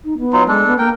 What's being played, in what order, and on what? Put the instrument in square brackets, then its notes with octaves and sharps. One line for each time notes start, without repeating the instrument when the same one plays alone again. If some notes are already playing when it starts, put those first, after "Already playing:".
[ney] D#4
B3
[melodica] F#3 D#4 F4
[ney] G#3 [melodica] D4 A4
[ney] B3
[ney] A#3 [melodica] A#4 G5